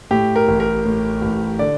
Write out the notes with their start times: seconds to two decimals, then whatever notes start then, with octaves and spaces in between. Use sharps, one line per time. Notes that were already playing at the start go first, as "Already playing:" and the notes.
0.11 A2 G4
0.35 A#4
0.48 A1
0.60 A#4
0.85 A2
1.22 A1
1.59 D3 D5